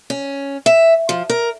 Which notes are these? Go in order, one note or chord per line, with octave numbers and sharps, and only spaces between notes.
C#4
E5
F3
A#4